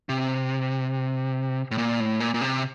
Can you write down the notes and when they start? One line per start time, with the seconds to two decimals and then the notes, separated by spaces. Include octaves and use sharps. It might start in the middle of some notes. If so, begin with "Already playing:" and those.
0.09 C3
1.71 A2
1.78 A#2
2.00 A2
2.20 A#2
2.34 A#2
2.41 C3